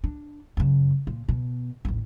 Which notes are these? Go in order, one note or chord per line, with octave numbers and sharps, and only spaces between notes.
D4
F#2 C#3
A#2
B2
A1 D#2